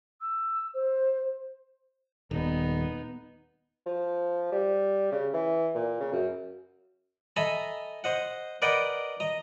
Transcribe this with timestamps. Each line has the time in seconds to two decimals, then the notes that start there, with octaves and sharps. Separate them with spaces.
0.21 E6
0.73 C5
2.31 D#1 B3 D#4
3.87 F3
4.52 G3
5.12 C#3
5.34 E3
5.75 A#2
6.00 C#3
6.13 F#2
7.36 A4 D#5 E5 G#5 A#5 B5
8.04 C5 D#5 F#5
8.62 A#4 B4 D5 D#5 F#5 G5
9.20 D#5 A#5